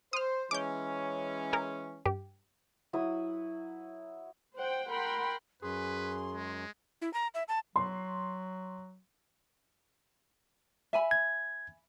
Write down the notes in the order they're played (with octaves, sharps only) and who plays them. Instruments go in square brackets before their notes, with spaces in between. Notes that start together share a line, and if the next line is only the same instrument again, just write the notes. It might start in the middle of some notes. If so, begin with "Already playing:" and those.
[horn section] C5 [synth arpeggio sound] D#6 F6
[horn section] E3 G#3 C#4 [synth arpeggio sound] D6 G6
[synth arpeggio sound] G#4 A#4
G2 G4
[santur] F#3 E4 D#6
[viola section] C5 F#5 G5
A#4 F#5 G5 B5 C6
[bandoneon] F#2 [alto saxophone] G#4 [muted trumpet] B4 [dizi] C6
[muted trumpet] G#3
[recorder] E4
A#5
E5
A5
[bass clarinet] F#3 [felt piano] C6
[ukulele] E5 G#5 B5
[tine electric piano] G#6